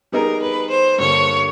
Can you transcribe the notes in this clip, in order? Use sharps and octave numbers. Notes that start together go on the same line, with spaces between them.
G3 B3 D#4 G#4 A#4
B4
C5
G2 D3 G3 A#3 C#5